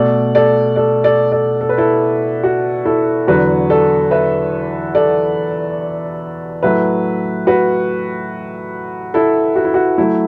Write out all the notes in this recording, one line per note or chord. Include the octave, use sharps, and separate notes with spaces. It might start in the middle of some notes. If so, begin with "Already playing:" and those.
Already playing: B2 A3 A4 D5
A4 D5
A4 D5
A4 D5
A4 D5
A4
B4
E4 A4
F#4
E4 A4
E2 D3 F#3 F#4 B4
A4 D5
B4 E5
A4 D5
A2 F#3 A3 B4 E5
F#4 B4
E4 A4
F#4
E4
F#4
F#3 A3 E4